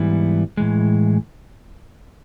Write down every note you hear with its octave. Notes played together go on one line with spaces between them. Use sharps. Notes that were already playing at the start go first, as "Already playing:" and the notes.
Already playing: G#2 E3 G3 B3 E4
A2 E3 G#3